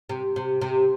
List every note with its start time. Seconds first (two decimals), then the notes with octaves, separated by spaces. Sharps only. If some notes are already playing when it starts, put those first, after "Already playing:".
0.09 C3
0.36 C3
0.61 C3